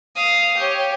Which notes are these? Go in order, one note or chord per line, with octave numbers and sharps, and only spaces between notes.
F5 D#6
G4 C#5